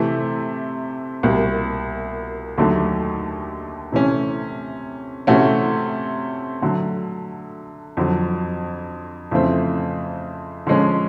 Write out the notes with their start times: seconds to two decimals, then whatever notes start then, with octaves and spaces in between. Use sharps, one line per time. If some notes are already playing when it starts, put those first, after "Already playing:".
Already playing: C3 E3 A3
1.23 C2 B2 G3 A#3
2.58 D#2 D3 F#3 A3
3.92 C3 E3 A3 C#4
5.27 C3 E3 A3 C#4 F#4
6.62 D3 F#3 A3
7.97 F2 D3 F#3
9.31 F2 C#3 E3 A3 C4
10.67 D3 F3 G#3 C#4